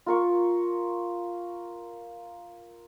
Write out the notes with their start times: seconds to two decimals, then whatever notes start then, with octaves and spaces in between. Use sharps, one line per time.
0.06 F4 A#4 C#6